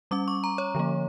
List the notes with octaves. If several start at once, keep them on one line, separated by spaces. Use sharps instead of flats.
G3 C#4 D6
C#6
A#5
C#5
D3 F3 A#3